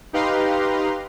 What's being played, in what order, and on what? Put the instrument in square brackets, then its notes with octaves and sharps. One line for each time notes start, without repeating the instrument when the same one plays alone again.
[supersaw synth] D#4 G4 B4 F5 A#5 C6